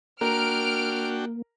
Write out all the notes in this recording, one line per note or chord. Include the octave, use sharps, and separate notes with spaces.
A#3 D4 F#4 A#4 G5 A#5 F6 D7